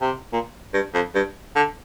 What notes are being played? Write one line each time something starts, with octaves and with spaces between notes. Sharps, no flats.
C3
A#2
G2
F2
G2
D3